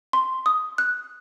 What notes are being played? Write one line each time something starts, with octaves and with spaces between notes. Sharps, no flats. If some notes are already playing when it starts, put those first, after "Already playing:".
C6
D#6
F#6